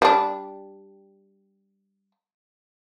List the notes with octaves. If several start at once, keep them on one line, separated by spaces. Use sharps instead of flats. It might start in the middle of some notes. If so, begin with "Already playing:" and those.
G3 D4